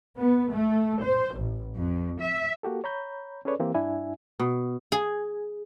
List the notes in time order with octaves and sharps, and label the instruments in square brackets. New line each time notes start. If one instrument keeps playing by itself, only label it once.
[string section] B3
A3
C5
A1
F2
E5
[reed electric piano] A#3 F#4 G4 A4
C#5 A#5 B5 G6
C#4 G#4 A4 B4 C#5 D5
E3 A#3 C4 G4
G2 D4 E4 E5 G#5
[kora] B2
[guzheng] G#4